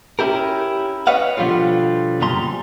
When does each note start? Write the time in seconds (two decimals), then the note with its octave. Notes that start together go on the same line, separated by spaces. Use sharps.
0.19 C#4 E4 G4 A#4
1.07 B4 C#5 D#5 F5 F#5
1.37 B2 D3 F3 G3 A3 F4
2.21 F#2 A#2 C#3 G3 A#5 C6